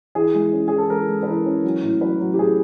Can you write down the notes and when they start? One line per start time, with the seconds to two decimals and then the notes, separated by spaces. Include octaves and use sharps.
0.15 E3 G#4
0.34 G#3
0.53 C#4
0.68 E3 G#4
0.78 A4
0.90 G#3 A#4
1.09 G#3
1.23 B4
1.27 E3 A#4
1.46 C#4
1.64 F#3
1.82 A2
2.01 F#3 B4
2.20 F#3
2.34 G4
2.38 A2 G#4